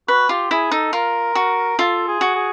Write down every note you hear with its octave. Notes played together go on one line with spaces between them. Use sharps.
F#4 B4
F4 G4
E4 G#4
D#4 A4
F4 A#4
F#4
F4 A4
G#4
F#4
G#4